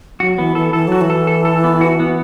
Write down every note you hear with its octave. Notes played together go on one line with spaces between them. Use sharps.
F#3 F#4
E3 B3
E3 A4
E3 A4
F#3 F#4
E3
A4
A4
A4
B3
F#4
B3